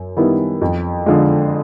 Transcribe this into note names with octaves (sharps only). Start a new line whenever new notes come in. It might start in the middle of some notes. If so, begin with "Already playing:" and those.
Already playing: F#2
D#3 G3 B3 E4
F2
D3 F3 G#3